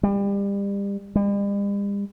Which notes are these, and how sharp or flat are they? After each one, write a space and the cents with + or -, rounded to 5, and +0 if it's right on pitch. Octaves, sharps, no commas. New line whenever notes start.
G3 +30
G3 +45